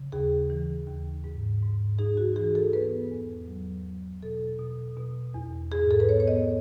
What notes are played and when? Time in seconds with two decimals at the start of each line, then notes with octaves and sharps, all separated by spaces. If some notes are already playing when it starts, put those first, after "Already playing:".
Already playing: C#3
0.12 D#2 G#4
0.50 E3
0.87 D#2
1.24 G#2
1.62 G#2
1.99 D#4 G#4
2.17 F#4
2.36 E3 G#4
2.55 A4
2.73 B3 B4
3.11 E2
3.48 F#3
3.85 F#3
4.23 B2 A4
4.59 B2
4.97 B2
5.34 E2
5.71 G#2 G#4
5.91 A4
6.00 B4
6.09 B3 C#5
6.20 C#5
6.28 D#5